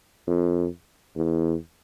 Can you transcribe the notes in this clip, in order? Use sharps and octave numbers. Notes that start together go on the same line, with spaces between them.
F2
E2